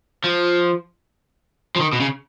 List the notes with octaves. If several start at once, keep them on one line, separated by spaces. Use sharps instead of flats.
F3
F3
D#3
B2
C#3